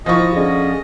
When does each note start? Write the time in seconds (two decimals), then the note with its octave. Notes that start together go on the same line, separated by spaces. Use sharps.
0.06 D#3 F3 E4 F4 D#5 C#6
0.35 D3 C#4 G#4 D#5